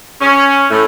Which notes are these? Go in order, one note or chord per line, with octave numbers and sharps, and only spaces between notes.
C#4
A2